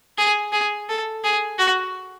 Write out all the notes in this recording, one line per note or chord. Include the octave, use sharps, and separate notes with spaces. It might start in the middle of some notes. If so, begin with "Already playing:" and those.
G#4
G#4
A4
G#4
F#4